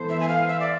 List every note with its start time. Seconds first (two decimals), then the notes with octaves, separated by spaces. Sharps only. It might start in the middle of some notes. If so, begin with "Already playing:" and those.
Already playing: E3 B3 E4 A4 C5
0.09 E5
0.20 G#5
0.29 F5
0.48 E5
0.60 D5